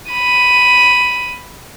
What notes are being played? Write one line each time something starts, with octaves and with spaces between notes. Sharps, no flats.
B5 D#7